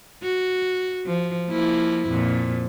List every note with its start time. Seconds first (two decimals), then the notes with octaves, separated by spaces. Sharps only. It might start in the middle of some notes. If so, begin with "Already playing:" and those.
0.23 F#4
1.06 F3
1.50 F3 A#3 E4
2.08 F2 A#2